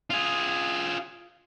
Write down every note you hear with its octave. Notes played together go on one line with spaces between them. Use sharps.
F4 G#4